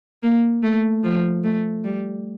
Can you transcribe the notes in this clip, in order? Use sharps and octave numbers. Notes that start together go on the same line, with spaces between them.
A#3
A3
F3
A3
G3